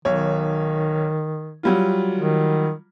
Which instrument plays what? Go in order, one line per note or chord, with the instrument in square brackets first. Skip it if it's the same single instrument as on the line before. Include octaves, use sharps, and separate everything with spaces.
[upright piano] B1 C#5 [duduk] D#3
[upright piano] F#3 G3 F4
[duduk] D#3